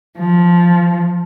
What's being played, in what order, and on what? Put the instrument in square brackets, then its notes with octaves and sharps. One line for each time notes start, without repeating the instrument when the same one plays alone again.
[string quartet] F3